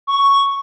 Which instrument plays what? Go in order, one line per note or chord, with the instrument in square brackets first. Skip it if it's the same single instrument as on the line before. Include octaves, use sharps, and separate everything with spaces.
[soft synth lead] C#6